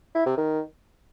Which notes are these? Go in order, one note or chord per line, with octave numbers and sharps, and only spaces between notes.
E4
C3
D#3